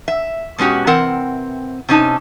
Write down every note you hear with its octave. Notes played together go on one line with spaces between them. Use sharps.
E5
B2 G#3 C#4 F#4 G4
C3 E3 C4 A#4 F#5
C3 C#4 D#4 A5